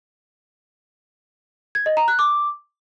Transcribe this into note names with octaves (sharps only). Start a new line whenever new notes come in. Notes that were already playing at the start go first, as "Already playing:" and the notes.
G#6
D#5
A#5
F#6
D6